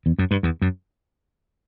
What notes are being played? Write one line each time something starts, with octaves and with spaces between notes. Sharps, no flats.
E2
F#2
G2
E2
F#2